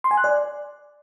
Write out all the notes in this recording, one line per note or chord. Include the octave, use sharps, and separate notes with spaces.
C6
G#5
F#6
D5